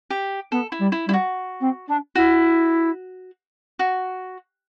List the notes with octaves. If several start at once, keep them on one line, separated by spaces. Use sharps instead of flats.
G4
B3 A4
E4
G3
E4
G3 E4
F#4
C4
D4
E4 F#4
F#4